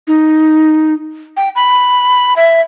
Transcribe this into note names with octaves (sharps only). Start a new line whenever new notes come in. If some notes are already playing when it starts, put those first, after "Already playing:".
D#4
G5
B5
E5